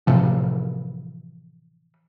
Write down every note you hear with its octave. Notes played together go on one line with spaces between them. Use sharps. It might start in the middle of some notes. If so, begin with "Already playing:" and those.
A2 C3 E3 F3